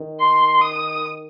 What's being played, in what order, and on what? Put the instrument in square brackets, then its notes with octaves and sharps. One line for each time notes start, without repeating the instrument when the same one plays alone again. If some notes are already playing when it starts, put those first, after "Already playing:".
Already playing: [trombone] D#3
[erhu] C6
D#6